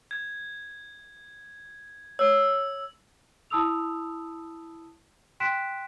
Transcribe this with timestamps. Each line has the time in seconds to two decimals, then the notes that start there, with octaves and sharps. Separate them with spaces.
0.11 G#6
2.19 C#5 E6
3.50 E4 A5 B5 D#6 E6 F7
5.40 G5 C6 F#6 B6 D7 E7